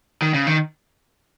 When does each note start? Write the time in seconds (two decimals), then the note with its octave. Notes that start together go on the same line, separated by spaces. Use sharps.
0.22 D#3
0.34 C#3
0.47 D#3